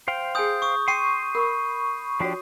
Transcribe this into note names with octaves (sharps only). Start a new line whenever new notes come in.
C5 F5 G5
G#4 G#5 C6 D#6 G6
C#6 D#6
G5 C6 C#6 C7 D#7
A#4 B5 C#6
F3 D4 F#4 G4 C#5